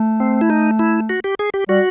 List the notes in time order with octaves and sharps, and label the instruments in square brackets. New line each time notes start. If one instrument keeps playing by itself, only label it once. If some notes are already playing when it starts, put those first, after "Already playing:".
Already playing: [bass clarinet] A3
[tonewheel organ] C4
E4
D#4
E4
F#4
G4
G#4
G4
[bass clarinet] G3 [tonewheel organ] F#4